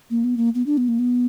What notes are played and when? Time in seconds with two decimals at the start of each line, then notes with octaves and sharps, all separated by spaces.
0.10 A#3
0.24 B3
0.37 A#3
0.55 B3
0.66 D4
0.77 B3
0.88 A#3
0.99 B3